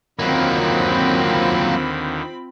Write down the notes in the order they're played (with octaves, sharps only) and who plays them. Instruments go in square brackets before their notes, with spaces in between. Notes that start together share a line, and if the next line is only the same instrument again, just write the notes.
[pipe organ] D#2 D3 D#3 [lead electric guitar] F#3 A#3 [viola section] C4 F4 B5